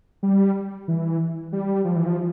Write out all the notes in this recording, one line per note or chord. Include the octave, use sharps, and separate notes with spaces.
G3
E3
G3
F3
E3
F3